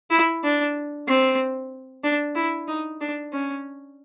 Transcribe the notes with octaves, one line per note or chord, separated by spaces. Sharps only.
E4
D4
C4
D4
E4
D#4
D4
C#4